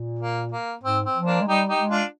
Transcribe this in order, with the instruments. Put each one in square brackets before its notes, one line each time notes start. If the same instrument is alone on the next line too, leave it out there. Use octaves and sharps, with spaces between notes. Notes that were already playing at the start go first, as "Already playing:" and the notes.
Already playing: [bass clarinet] A#2
[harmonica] A#3
A#3
[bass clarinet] G#2 [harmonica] C4
[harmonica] C4
[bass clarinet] F3
[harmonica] A#3 D4
[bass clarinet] G#3
[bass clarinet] G3 [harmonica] D#4 G4
[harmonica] D#4 G4
[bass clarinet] G#3
[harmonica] D4 F4